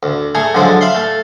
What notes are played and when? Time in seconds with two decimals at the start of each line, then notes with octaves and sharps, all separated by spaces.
0.03 D2
0.35 A3 G#4 A#5 C#6
0.55 D3 F3 F#3 G#3 A4
0.81 E5 F5 B5 C6
0.95 A3 A4